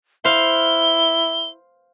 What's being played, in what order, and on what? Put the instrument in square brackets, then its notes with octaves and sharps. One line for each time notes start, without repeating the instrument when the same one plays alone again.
[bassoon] E4 [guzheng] C5 F5 [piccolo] G7